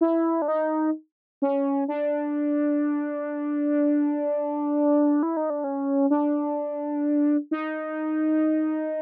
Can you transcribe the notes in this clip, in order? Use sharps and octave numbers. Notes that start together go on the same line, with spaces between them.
E4
D4
D#4
C#4
D4
E4
D#4
D4
C#4
D4
D#4